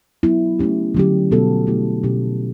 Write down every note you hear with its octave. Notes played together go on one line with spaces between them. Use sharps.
F#3 B3 E4
A3 C#4 G4
D3 F#3 C#4 G4
B2 G3 B3 F#4 A4
A3 E4 G4
B2 F#3 C#4 G4